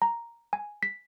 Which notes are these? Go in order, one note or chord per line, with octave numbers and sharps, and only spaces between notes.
A#5
G#5
B6